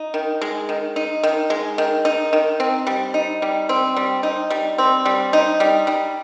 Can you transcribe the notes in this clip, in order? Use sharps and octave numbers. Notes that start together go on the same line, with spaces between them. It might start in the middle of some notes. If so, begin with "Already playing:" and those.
Already playing: D#4
D#3
G#3
D#3
D#4
D#3
G#3
D#3
D#4
D#3
C4
G3
D#4
G3
C4
G3
D#4
G3
C4
G3
D#4
G3
G3